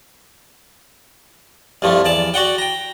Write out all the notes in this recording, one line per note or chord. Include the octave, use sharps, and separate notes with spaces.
C2 G2 F3 A3
E2 D5 A5
F#4 D5 F#5 G5
G5 A#5